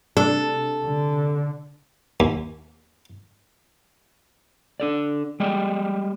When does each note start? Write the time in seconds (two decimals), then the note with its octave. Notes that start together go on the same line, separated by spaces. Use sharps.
0.17 C3 D4 A4
0.85 D3
2.20 D#2
4.80 D4 A4 D5
5.40 G3 G#3 D5 D#5 G5